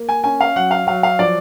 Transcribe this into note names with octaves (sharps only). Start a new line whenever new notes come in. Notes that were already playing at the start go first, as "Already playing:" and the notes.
Already playing: A#3
G#5
C#4 G#5
F5
F#3 F#5
F5
F#3 F5
F5
F3 D5